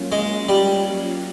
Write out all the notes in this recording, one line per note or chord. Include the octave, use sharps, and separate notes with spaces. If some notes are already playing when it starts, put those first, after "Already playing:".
Already playing: F#3 A#3 C#4 F4
G#3
G3